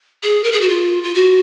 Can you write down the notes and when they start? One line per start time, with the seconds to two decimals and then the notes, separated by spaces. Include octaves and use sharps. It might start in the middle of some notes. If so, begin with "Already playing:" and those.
0.23 G#4
0.44 A#4
0.52 G#4
0.61 F#4
0.69 F4
1.03 F4
1.14 F#4